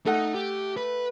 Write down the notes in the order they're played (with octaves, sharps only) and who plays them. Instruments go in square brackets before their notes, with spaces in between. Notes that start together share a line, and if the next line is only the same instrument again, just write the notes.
[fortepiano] A3 F#5 [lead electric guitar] D#4
[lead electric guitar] G4
B4